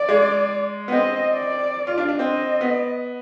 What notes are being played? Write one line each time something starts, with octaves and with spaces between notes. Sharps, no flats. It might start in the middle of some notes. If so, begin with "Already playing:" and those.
Already playing: D5
G#3
B3
C4 D#5
D5
F4
D4
D4
C4 D#5
B3